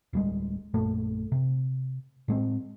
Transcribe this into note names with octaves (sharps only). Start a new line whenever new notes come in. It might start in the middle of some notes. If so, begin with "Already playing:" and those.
D1 G3 G#3
A#1 F#2 A#2 A3
C3
A2 G#3 C4